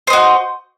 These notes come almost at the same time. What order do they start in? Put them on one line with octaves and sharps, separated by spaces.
C5 D#5 F#4